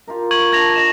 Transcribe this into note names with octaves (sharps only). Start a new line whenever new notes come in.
F4 G4 A#4
C#6 G#6 F#7
D4 G5 G#6 A#6 F7
D#5 F#5 A5 A#6 E7